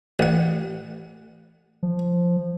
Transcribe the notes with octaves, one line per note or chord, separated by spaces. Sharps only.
A1 F#5
F3